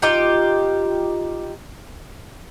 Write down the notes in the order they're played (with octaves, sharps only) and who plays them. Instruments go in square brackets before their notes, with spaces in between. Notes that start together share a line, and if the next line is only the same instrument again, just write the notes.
[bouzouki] D#4 F4 G4 G5